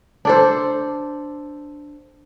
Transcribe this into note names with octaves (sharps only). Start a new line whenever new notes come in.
D4 A4 C5